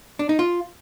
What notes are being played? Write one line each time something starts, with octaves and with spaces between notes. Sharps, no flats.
D4
D#4
F4